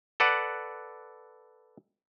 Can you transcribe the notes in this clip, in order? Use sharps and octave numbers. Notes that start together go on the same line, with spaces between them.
A4 B4 D5 F#5